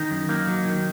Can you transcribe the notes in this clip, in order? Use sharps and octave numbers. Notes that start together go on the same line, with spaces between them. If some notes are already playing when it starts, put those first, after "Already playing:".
Already playing: D#3 D#4
F#2
A#3 D#4
F#3
D#3